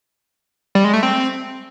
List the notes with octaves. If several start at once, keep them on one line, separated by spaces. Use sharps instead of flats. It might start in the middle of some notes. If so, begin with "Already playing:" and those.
G3
G#3
A3
C4